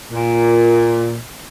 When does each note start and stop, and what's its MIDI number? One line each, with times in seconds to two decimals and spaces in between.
0.12 1.17 46